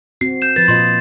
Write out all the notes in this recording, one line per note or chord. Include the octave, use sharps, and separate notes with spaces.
C4 F#4 C7
G6 E7
F3 B4 A6
A#2 F4 D#5 C6